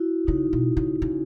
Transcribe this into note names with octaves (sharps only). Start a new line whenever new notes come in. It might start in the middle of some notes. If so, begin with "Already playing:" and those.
Already playing: E4 F#4
C#3 D#4
B2
C#3
C#3